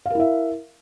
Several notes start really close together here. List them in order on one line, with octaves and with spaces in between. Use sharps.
F5 A#4 E4 E5